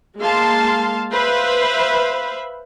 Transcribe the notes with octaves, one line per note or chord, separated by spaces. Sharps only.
G#3 A#3 F5 A5 C6
B4 C5 E5 F5 B5